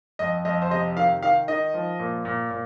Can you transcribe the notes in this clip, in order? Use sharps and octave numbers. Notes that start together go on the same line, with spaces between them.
F2 D#5
F2 D#5
C5
C3 D#5
D#3 F5
D#3 F5
D#3 D#5
F3
A#2
A#2
A#2